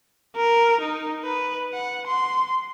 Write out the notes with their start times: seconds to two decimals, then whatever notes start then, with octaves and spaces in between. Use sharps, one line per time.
0.36 A#4
0.81 D#4
1.24 B4
1.73 F#5
2.07 C6